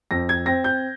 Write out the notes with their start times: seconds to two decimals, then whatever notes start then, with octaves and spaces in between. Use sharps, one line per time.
0.11 F2 A#6
0.29 G#6
0.46 C4 A#6
0.64 G6